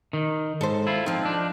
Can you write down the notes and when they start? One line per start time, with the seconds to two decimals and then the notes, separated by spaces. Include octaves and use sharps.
0.13 D#3
0.61 G#2 A4 C5
0.87 E4 F4
1.06 F3 C4 D#4
1.25 D4